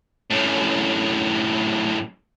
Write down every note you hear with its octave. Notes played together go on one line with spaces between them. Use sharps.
F#2 A2